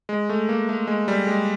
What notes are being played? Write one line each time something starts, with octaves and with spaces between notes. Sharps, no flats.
G#3
A3
A#3
A3
G#3
G3
G#3